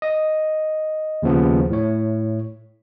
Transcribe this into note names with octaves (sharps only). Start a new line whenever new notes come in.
D#5
D#2 C#3 F3 B3
A2 C#5